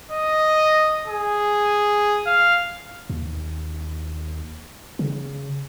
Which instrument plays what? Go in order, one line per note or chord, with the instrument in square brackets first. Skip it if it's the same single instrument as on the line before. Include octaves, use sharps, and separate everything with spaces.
[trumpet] D#5
G#4
F5
[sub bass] D#2
C#3